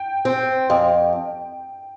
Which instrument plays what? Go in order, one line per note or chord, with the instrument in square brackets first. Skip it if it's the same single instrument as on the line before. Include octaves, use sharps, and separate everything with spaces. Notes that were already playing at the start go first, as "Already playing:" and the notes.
Already playing: [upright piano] G5
[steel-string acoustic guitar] C4
F2